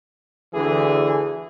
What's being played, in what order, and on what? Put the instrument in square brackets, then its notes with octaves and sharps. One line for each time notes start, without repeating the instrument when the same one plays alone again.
[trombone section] D2 D3 E3 G#4